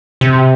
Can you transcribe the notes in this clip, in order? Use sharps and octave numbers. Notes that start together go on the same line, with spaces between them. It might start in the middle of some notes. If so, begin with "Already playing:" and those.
C3